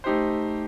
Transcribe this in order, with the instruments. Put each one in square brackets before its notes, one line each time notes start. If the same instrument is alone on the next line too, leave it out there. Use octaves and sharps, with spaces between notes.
[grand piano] A3 D#4 G4 C5